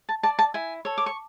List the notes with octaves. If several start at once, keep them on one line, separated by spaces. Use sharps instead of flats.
A5
D5 A5
A5
E4 G#5
A4 C#5
D6
C#6